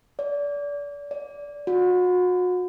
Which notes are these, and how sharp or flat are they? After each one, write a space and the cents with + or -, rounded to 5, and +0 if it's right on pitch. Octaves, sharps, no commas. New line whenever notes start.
D5 -30
D5 -20
F#4 -35